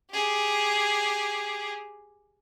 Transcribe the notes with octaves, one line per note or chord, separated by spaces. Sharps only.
G4 G#4